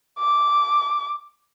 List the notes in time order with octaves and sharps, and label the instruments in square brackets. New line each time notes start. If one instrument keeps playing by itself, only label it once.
[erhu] D6